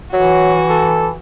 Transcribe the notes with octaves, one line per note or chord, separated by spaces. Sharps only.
E3 F#3 F#4
A4